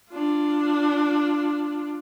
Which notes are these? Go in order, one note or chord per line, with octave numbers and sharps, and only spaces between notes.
D4 F4